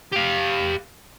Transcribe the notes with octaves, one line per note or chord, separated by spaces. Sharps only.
G4 F5